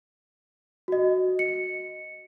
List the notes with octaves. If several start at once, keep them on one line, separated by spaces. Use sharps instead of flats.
F#4 D#5
C#7